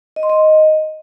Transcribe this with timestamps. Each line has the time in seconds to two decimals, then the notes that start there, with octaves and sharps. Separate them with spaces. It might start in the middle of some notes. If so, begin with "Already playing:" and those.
0.16 D#5
0.23 C6
0.30 D#5